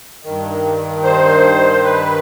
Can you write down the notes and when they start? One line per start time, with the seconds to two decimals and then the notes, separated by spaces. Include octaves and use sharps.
0.23 G2 D#3
1.03 C5
1.72 C5
1.84 B4